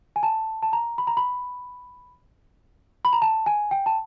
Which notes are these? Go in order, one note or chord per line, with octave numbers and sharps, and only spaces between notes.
G#5
A5
A5
A#5
B5
A#5
B5
B5
A#5
A5
G#5
G5
A5